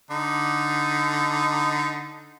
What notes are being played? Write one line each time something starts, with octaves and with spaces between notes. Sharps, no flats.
D3 D#4